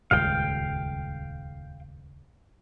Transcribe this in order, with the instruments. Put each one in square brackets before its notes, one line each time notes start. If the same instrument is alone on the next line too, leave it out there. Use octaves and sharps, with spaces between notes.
[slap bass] D#1 C#2 G2 [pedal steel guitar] F5 G5